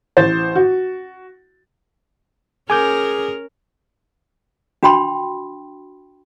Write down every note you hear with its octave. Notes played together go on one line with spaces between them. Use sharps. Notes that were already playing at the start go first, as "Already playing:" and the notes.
A1 C5 A6
F#4
C#4 G#4 A#4 G#5 D6 G6
D4 F#4 G5 B5 C6